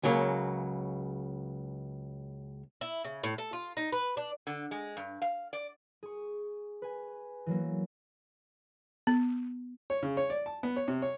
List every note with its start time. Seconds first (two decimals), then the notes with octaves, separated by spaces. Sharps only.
0.03 C#2 C#3 F#3 A#3
2.81 E4
3.04 C#3
3.24 A2
3.38 A4
3.53 F4
3.77 D#4
3.92 B4
4.17 D4
4.47 D3
4.71 G#3
4.97 G2
5.22 F5
5.53 D5
6.03 G#4 C#6
6.82 B4 G#5
7.46 E3 F#3 A#3
9.07 B3
9.90 C#5
10.03 C#3
10.17 C#5
10.30 D5
10.46 A5
10.63 B3
10.76 C#5
10.88 C3
11.02 C#5